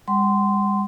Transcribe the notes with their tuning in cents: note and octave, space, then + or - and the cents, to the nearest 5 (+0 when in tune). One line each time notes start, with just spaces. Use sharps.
G3 +45 F#5 +30 C6 -15